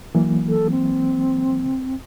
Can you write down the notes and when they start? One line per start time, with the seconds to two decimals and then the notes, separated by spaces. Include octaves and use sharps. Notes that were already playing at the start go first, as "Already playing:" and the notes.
0.15 E3 F#3 A#3
0.48 A4
0.70 C4